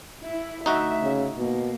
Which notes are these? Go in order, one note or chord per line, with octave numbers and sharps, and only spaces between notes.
E4
D2 D#4 F#4 E5
C#3
B2 A#3